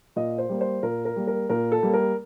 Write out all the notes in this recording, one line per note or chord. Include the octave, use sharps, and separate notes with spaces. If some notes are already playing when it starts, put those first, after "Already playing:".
A#2 D#5
C5
G3 A#3
C5
A#2 A#4
A#4
G3 A#3
A#4
A#2 A#4
A4
G3 A#3
A#4